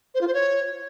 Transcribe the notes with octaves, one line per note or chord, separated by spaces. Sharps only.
C5
F4
C5
C#5